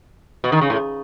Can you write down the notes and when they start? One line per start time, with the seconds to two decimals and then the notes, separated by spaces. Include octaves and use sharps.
0.44 B2
0.52 D#3
0.61 C#3
0.70 A2